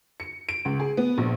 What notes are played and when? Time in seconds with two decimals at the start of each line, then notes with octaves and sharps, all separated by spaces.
0.20 C#7
0.49 D7
0.65 C#2
0.80 G#4
0.97 B3
1.18 A#1